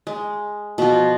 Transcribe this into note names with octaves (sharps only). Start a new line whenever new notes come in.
G#3
B2 F3